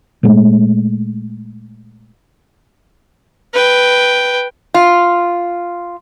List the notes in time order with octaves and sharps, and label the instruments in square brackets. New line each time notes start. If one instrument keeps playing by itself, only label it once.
[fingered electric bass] A#2 G#3 A3
[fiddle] B4 G5
[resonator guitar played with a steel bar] F4